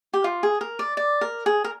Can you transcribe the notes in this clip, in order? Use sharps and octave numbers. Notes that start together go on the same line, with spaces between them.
G4
F4
G#4
A#4
D5
D5
A#4
G#4
A#4